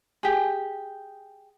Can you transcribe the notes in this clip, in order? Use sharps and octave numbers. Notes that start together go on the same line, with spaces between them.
G4 G#4